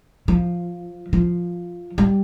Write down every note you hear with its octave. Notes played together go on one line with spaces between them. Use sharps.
F3
F3
G3